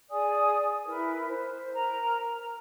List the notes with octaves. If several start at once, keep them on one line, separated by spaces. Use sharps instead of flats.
G#4 D5 G#5 D#6
E4 A#4 B4
C5
A#4 A#5
A#4